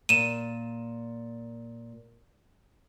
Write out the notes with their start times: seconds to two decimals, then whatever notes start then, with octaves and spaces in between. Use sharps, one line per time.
0.09 A#2 D#7 E7